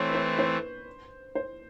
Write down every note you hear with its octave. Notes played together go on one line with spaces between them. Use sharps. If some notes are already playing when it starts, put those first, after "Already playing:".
Already playing: E3 A3 C4 C#5
B4
C5
B4
C5
C5